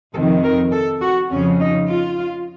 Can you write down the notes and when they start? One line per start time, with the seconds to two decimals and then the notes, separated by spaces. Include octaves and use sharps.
0.13 F2 C3 D#3 A4
0.43 A#4
0.72 A4
1.01 F#4
1.31 F2 C#3 F3 C#4
1.60 D#4
1.89 F4